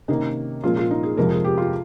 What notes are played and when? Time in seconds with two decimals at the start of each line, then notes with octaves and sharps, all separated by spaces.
0.08 C3 D#3 A#3 C#4 D#4
0.62 A#2 F3 G#3 C#4 F4
0.77 F4
0.91 D#4
1.03 G#4
1.17 F2 C3 F3 G#3 A#4
1.31 G#4
1.44 G4
1.58 F4